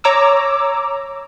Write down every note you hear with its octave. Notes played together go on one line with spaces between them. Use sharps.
C#5 A#5 D6 E6